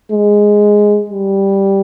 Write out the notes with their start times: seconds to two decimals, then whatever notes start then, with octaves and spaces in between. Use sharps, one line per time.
0.12 G#3
1.10 G3